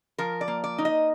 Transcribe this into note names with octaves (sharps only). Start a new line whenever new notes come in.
F3 A#4
D5
A#3
D5
D#4
D#5